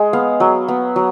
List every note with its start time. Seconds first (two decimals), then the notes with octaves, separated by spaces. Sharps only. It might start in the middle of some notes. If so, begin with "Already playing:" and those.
Already playing: G#3
0.13 B3 F5
0.40 F#3
0.68 B3
0.96 F#3